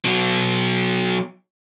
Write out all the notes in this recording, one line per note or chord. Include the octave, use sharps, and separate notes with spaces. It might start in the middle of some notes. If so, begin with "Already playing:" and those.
B2 F#3